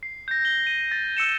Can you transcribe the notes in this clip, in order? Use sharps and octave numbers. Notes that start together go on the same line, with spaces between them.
C7
G6 A#6
G7
D#7
A6
E6 C#7 E7